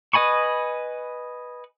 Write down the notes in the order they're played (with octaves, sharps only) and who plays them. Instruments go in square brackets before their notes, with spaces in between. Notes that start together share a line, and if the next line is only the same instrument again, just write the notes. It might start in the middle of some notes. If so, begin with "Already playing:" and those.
[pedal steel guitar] B4 D#5 G#5 B5 C#6